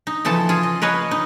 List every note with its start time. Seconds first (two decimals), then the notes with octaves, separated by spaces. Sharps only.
0.07 D#4
0.25 C#3 E3 F3 A4 A5
0.49 F4 G#4
0.63 D#5
0.82 A#4 B4 C#5 D#5 F5
1.11 D#4